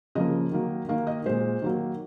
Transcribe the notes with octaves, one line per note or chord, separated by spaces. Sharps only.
C#3 F3 A#3 D#5
D#3 F#3 A#3
D#3 A#3 F5
D#5
A#2 G#3 C5
D#3 F#3 A#3